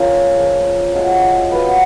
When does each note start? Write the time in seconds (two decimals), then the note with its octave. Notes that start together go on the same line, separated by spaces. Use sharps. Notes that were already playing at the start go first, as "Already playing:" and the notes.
Already playing: F3 A#3 C#4 F4
0.37 F3 A#3 F4 G#4
0.93 F3 G#3 C#4 F#4
1.51 B3 F#4 B4 F5